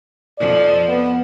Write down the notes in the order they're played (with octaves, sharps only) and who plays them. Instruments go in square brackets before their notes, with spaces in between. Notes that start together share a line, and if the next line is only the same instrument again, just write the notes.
[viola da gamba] F2 F3 [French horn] D5
[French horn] B3